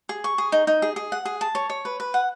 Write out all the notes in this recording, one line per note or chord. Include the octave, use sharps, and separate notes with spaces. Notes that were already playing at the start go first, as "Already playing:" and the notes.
G#4
C#6
G#4
D#4
D#4
G#4
G#4
F#5
G#4
A5
C#5
C#5
B4
B4
F#5